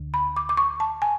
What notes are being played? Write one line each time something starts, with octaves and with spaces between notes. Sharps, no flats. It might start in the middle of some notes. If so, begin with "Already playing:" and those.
Already playing: D2 D3
B5
D6
D6
C#6
A5
G#5